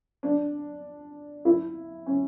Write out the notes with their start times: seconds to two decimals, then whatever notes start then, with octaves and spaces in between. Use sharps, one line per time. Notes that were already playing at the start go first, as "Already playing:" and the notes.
0.23 D4
1.45 E4
2.06 C#4